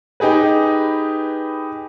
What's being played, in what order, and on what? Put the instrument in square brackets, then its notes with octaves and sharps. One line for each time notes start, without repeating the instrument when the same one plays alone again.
[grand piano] D#4 G4 G#4 B4